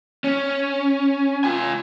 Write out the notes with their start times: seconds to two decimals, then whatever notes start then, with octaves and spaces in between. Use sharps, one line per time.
0.24 C#4
1.44 F4 G#5